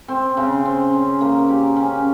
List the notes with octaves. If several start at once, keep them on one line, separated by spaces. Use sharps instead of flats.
C4
C#3
C4
C#4
A#3
G4
C#4